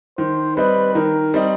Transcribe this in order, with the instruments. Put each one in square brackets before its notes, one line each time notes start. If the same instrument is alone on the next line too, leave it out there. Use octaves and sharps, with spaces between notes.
[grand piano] D#3 [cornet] C5
[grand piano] G3 C4 D#4 [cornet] B4
[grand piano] D#3 [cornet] A#4
[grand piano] G3 C4 D#4